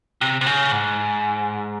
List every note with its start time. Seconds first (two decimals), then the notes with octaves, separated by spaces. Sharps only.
0.21 C3
0.41 C3
0.46 C#3
0.72 G#2